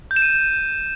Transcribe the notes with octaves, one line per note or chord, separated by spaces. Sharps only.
G6
E7
D#7